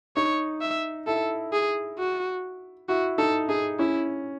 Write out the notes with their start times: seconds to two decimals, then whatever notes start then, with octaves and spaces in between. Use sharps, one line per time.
0.16 D#4 C#5
0.61 E5
1.07 E4 A4
1.53 G#4
1.98 F#4
2.89 E4 F#4
3.18 D#4 A4
3.49 D#4 G#4
3.79 C#4 E4